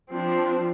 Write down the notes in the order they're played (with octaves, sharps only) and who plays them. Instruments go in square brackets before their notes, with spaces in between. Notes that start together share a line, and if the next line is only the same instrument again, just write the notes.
[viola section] F3 C4 D4